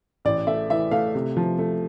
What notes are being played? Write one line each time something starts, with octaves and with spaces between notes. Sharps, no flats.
A1 D5
A3 E5
E3 E5
A3 F5
C3
F3
A3